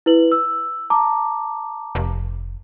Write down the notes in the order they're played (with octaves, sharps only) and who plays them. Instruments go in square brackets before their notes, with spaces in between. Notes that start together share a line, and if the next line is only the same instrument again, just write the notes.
[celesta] E4 B4 F#7
E6
A5 A#5 D6
[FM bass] F1